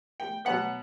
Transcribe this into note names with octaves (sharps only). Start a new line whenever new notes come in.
G5
B2 F#3 B3 F#5